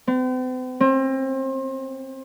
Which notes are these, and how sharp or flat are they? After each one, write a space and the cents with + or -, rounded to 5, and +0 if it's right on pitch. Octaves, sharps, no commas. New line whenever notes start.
C4 -45
C4 +30